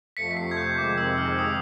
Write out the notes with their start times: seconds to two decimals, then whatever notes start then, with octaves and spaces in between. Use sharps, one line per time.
0.17 F2 C3 F3 A3 B6 C#7
0.31 B6
0.37 C7
0.51 G#6
0.57 G6
0.77 F2 C3 D#3 G#3 C4 D6
0.98 E6
1.18 F6
1.39 D#6